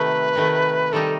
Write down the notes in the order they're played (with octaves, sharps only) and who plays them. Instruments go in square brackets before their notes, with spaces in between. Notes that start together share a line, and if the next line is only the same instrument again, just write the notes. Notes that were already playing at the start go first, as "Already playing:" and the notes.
Already playing: [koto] C3 D#3 A3 [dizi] B4
[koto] C3 D#3 A3
[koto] D#3 G3 D#4 [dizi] A4